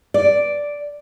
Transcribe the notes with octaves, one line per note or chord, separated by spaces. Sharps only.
D5